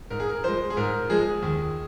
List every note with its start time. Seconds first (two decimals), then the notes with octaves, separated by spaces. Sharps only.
0.10 G#2 A#4
0.20 G#4
0.29 A#4
0.43 F3 G#3 C5
0.70 G#4
0.77 G#2 A#4
1.10 F3 G#3 G#4
1.42 D#2